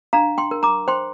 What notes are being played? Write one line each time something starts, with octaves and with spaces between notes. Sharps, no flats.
D4 F5 A#5
G5 C6
A#4
A#5 D6
C5 G5 C6